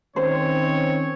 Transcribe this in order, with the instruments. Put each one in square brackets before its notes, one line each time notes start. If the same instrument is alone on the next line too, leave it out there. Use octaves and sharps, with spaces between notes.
[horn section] D#3 C4 C#4 [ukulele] C5 [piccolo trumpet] C#5